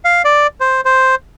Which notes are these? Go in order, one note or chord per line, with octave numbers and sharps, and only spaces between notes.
F5
D5
C5
C5